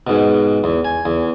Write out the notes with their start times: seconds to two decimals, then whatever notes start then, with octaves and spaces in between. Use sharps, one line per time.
0.07 G#2 B2
0.64 E2
0.85 G#5
1.05 E2